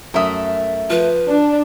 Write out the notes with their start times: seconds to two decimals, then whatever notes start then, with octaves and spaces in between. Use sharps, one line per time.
0.14 F#2 A3 A#4 E5 D#6
0.90 F3 B4
1.28 D4